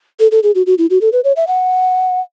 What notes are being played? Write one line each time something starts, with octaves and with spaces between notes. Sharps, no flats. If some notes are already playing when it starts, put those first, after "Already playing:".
A4
A4
G#4
F#4
F#4
E4
F#4
A4
B4
C#5
E5
F#5